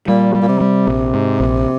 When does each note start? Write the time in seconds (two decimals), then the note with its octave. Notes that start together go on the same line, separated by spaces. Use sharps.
0.08 A#2 G3
0.35 G3
0.42 A#2
0.48 C3
0.61 G3
0.87 A#1
1.14 G#2
1.40 A#1